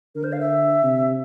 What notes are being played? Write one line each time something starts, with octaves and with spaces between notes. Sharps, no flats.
D3 A#4
C5
F5
E5
C3